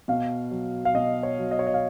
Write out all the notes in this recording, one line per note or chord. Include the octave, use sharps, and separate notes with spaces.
B2 F5
F#3
F5
B2 D#5
C#5
F#3
D#5
C#5
D#5
F5